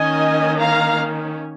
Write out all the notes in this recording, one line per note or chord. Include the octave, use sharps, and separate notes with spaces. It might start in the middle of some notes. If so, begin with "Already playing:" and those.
Already playing: D#3 A#3 C#4 D#5 G#5
F5 A#5